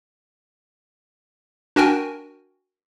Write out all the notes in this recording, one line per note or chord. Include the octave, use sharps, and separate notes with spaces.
D4 F#4 A#4 G5 G#5